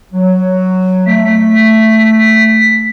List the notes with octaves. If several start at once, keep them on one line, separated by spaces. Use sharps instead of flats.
F#3
A3 B6